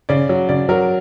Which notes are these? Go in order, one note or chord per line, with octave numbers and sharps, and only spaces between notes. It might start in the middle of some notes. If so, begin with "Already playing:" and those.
C#3 D5
F#3
C#3 D5
F#3 A#4